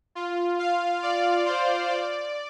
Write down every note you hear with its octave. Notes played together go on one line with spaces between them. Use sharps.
F4
F5
D5
C5
D5